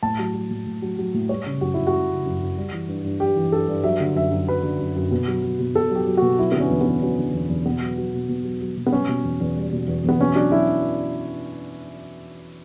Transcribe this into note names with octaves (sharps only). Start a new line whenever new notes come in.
A2 A5
F#3
F#3
A2
A2
F#3
F#3
A2
G3 C#5
C#3
F#2 F#4
F#2 E4
F#4
G3
C#3
F#2
F#2
G3
E3
G2
G2
G3 G4
E3
G2 A4
G2
F#3 E5
D3
F#2 E5
F#2
F#3 B4
D3
F#2
F#2
B2
F#3
F#3
B2
B2 A4
F#3 G4
F#3
B2 F#4
F#3 E4
B3
D3
C#4
E2
E2 B3
F#3 C#4
D3
E2
E2
B2 B3
F#3
F#3
B2
B2
F#3
F#3
B2
B3
G3 C#4
B2
E2
E2
G3
B2
E2
E2 B3
B2 C#4
F#3 D4
F#3 E4